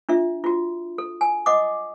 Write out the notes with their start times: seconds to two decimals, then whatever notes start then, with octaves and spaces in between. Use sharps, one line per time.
0.09 D4 F4 E5
0.44 F4 F#4
0.98 A4
1.21 G#5
1.46 D#5 F#5 D6 D#6